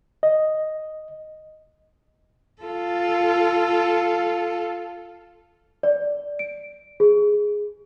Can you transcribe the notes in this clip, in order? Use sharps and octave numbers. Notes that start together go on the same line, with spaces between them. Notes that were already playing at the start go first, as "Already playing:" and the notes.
D#5
F4 A4
D5
D7
G#4